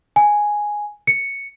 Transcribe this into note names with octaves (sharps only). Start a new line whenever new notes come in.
G#5
C#7